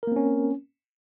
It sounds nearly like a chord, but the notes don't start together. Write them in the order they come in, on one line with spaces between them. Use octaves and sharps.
A#4 A#3 C4 C#4